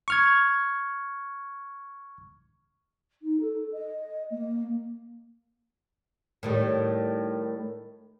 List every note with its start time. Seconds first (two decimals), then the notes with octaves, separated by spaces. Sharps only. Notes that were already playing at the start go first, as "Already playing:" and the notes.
0.08 C#6 F6 G#6
3.22 D#4
3.40 A4
3.72 D#5
4.30 A#3
6.43 A2 D#3 G3